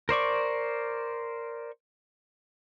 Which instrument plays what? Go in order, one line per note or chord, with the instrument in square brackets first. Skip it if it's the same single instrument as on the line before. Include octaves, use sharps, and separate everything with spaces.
[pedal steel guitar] A#4 C5 D5 C#6